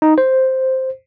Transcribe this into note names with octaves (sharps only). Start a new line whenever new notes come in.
D#4
C5